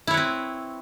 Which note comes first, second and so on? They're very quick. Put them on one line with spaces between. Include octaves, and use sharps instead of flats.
E4 C#5 B4 C4